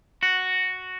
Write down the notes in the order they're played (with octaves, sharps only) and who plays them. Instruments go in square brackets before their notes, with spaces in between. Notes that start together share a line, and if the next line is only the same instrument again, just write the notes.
[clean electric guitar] F#4